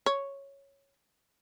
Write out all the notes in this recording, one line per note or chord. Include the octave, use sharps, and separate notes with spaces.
C#5